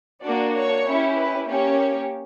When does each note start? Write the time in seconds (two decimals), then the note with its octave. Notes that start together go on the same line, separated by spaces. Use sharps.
0.23 A#3 D4 F#4 D5
0.54 C#5
0.86 C#4 E4 G4
1.18 B4
1.49 A#3 C#4 G4 C#5